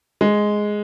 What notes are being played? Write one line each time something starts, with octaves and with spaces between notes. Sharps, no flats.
G#3